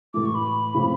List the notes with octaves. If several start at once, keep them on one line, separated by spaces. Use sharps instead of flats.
A2 E3 A3 D6
C#6
B5
C#3 F3 A3 C4